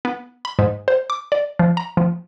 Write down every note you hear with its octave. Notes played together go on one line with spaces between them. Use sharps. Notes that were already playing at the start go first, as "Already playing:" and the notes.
B3
B5
G#2
C5
D6
D5
F3
A#5
F3